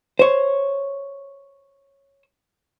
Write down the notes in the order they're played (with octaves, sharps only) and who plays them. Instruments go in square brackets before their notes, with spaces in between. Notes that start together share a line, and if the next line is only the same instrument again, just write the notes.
[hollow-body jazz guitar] C5 C#5